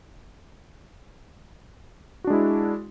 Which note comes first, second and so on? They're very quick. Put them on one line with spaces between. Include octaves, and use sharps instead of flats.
F#4 D4 G#3 E4